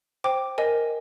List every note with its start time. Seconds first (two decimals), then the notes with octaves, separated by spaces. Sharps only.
0.24 C5 G5 D6
0.58 A#4 D#5 G#5